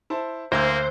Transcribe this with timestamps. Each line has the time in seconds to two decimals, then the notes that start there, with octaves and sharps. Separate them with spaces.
0.10 E4 C5 A5
0.52 D2 A#3 C5 E6 G6 G#6 A#6